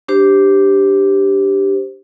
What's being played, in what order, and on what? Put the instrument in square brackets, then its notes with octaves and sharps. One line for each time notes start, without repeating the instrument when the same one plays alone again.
[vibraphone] D4 G4 C5